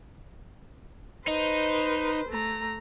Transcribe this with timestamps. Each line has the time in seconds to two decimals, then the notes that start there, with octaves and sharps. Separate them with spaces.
1.28 D#4 B4 C5
2.29 A3 A#5